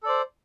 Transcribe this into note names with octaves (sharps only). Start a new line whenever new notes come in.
A4 C5 D5